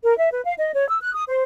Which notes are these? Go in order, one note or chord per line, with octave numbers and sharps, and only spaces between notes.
A#4
E5
B4
F5
D#5
C#5
E6
F#6
D#6
C5